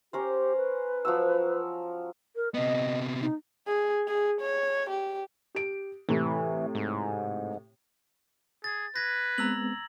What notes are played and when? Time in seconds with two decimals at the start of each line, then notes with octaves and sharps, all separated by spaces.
0.13 C#4 G4 A#4 C5
0.57 B4
1.05 F3 F#3 E6
2.36 A#4
2.54 C3 B3 D#5
3.21 D#4
3.67 G#4
4.07 G#4
4.41 C#5
4.90 G4
5.55 G4 D7
6.09 A2 C3 E3
6.75 G#2
8.64 G#4 A6
8.96 B4 G#6 A#6
9.38 G#3 B3 C4 A#5 E6 F#7